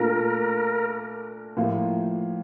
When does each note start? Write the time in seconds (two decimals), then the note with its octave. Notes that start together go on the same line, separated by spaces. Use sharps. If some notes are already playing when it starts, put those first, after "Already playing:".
Already playing: A#2 A3 D4 F4 A#4
1.57 A2 F3 A#3 F4